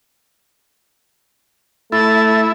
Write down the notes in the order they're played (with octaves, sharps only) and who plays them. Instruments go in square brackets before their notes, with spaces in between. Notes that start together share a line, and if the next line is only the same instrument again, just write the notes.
[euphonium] A3 [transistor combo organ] E4 [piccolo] A6